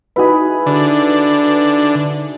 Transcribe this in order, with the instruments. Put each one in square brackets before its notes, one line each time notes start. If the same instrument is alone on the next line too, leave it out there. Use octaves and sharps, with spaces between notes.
[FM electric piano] D#4 F#4 B4 [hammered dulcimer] E4 G#4
[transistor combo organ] D3